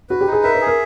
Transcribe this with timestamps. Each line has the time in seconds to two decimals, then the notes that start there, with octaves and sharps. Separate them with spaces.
0.09 F#4 B4
0.21 G4
0.27 D#4
0.33 G#4
0.44 A#4 E5
0.55 B4
0.61 G#4
0.67 A#4